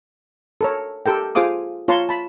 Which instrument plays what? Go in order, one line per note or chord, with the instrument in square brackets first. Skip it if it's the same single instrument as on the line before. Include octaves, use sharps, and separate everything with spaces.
[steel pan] A4 A#4 C#5
G4 A4 A#4 G5
F4 G#4 C5 F5 D6 D#6
F4 C#5 A5 A#5 C6 C#6
A5 B5